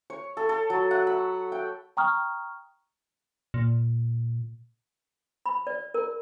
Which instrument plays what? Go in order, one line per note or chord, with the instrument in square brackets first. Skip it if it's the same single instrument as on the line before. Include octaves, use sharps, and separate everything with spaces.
[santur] C#5
A4
A4
F#3
F#5
B5
G5
[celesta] G5 A#5 C#6 D#6 F6
[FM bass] A#2
[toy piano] B5
D5
A#4